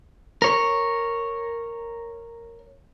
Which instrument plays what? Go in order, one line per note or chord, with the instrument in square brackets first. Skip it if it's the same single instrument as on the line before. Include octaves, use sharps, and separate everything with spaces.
[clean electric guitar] A#4 C#5